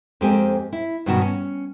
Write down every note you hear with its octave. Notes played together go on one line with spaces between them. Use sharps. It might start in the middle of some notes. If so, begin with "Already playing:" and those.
F2 G#3 A#3 C4 G4 G#5
E4
G2 B2 D#3 F#4 A5
C#4